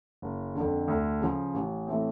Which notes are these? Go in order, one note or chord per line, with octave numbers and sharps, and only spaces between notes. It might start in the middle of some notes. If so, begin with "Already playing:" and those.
F#1
F2 D3
D2
C#3 F3
A1
A2 E3 A3 C4